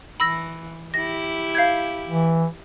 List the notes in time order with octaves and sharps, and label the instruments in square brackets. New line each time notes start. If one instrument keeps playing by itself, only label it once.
[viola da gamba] E3 [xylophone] B5 E6 A#6
[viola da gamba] E4 G4 [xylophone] A#6
[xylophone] F5 G6 G#6
[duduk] E3